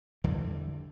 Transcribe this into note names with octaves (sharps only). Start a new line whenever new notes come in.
E2 D3 E3 G3